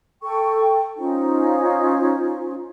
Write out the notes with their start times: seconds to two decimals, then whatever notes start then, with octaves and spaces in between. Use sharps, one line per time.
0.22 A4 G5 C#6
0.98 C#4 D#4 F4 C5